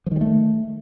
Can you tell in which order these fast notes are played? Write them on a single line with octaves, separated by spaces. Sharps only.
F3 D#3 G3 A3